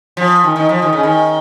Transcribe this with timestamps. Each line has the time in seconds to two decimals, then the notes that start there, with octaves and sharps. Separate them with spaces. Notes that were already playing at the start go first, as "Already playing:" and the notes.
0.17 F3
0.44 D#3
0.56 D#3
0.69 F3
0.82 D#3
0.93 C#3
1.03 D#3